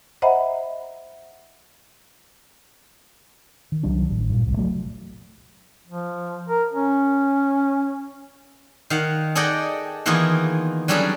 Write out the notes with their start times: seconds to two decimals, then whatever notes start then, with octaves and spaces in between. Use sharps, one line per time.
0.22 C5 D#5 E5 F#5 A#5 B5
3.72 D#3
3.83 C2 D#3 F#3 D4
4.10 A1
4.29 G2 A#2
4.45 G1 C2 G2
4.57 C#3 F3 F#3 A3
5.88 F3
6.49 A#4
6.73 C#4
8.90 D#3 F5 F#5
9.35 G#4 A4 D5 D#5 F#5 G5
10.06 D#3 E3 A#3 B3 F4 G#4
10.88 F#3 G3 C#4 D4 G#4 A4